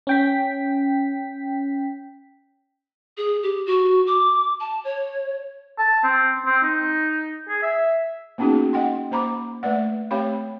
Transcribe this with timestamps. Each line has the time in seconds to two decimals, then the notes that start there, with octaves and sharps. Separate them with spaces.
0.07 C#4 G5 B6
3.17 G#4
3.43 G4
3.66 F#4
4.07 D6
4.60 A5
4.85 C#5
5.78 A5
6.04 C4
6.46 C4
6.63 D#4
7.49 G#4
7.63 E5
8.38 A#3 B3 C#4 D#4 F#4 G#4
8.73 D#5 F#5 G5 C6
9.11 A#3 C5 A#5 B5 D6
9.63 A3 B4 D5 F#5
10.11 A3 C4 G4 C#5 F5 B5